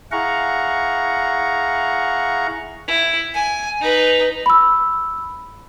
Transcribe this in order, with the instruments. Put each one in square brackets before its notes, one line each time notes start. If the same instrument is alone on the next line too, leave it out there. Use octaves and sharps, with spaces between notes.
[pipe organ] E4 G#4 F5 F#5 A#5 C#6
[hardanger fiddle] E4
G#5
D#4 B4
[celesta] B5 E6